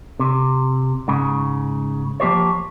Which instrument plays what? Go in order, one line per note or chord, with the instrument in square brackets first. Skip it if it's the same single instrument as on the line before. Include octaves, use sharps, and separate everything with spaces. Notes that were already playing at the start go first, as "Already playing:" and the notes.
[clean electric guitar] C3
G#2 C#3
F3 A#3 G4 C5 C#5